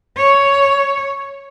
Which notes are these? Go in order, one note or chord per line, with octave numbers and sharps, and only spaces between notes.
C#5